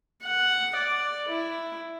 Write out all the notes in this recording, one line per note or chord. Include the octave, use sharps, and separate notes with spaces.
F#5
D5
E4